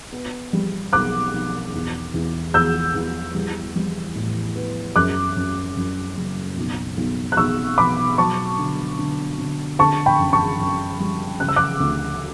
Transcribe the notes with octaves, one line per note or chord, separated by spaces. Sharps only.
B3
G3
B1 D6 F#6
B1
E2
E2
E2 E6 G6
E2
G3
G3
A2
B3
F#2 D6 F#6
F#2
F#2
F#1
B1
B1
F#6
B1 C#6 E6
B2 B5 D6
F#3 A5 C#6
D3
D3
D3
D3 A5 C#6
G5 B5
F#2
A5 C#6
F#2
G3
C#3 F#6
E6
D6 F#6
D2